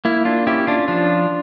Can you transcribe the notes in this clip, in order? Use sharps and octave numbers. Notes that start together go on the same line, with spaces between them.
A#3 E4
D4 F4
C#4 E4 G4
D4 F4
F3 D4 F4